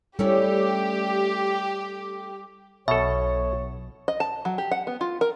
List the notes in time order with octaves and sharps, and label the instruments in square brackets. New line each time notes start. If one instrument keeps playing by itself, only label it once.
[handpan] G3 [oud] A3 C#4 E4 [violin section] G4
[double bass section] B1 [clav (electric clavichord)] B2 A4 [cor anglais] C#5 [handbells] E5
[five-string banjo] D#5
A5
F#3
G4
F#5
B3
F4
A#4